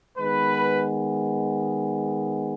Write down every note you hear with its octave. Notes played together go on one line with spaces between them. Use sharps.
D#3 G#3 B3 B4